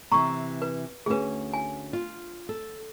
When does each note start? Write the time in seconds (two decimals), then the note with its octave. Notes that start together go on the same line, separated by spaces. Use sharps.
0.12 C3 E3 A#5 C#6
0.62 B4
1.06 D2 C#4 G#4 B4
1.53 G#5
1.93 F4
2.49 A4